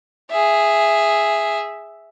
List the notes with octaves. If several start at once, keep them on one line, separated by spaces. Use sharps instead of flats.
G#4 E5